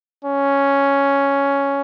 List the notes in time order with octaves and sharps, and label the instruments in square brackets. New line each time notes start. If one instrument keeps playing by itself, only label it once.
[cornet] C#4